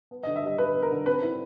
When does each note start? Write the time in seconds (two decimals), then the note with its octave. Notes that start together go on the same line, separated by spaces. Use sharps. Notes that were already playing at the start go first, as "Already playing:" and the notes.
0.11 B3
0.23 D#5
0.27 D3
0.36 E5
0.44 G3 D#5
0.58 D3 B4
0.74 B3
0.83 A#4
0.91 D3
1.06 C4 B4
1.22 E4